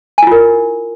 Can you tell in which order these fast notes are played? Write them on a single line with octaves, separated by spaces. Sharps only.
G#5 E4 F4 A#4